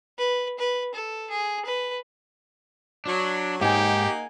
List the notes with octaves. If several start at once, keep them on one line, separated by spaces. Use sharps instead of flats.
B4
B4
A4
G#4
B4
F#3 D4
G#2 A#3 D#4 G4 F#5 G#5